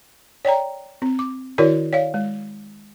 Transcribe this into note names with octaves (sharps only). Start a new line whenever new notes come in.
C#5 D5 G5 A#5
C4
D6
D#3 E4 F#4 A#4 C#5 D5
C#5 D5 F5
G#3